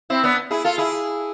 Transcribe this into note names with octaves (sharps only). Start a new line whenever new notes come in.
C4 E4
B3 D4
E4 G#4
F4 A4
E4 G#4